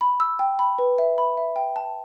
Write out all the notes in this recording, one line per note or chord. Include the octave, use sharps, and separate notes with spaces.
B5
E6
G5
B5
B4
E5
B5
E5
G5
A5